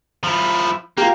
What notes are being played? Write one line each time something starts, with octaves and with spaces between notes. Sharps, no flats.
F3 E4
A#3 F4 G4